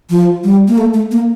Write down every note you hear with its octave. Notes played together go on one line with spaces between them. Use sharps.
F3
G3
A#3
A3
A3
A#3